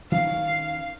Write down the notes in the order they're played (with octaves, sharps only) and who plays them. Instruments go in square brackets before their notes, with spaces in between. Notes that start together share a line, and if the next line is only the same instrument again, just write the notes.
[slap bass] D#3 C#4 [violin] F5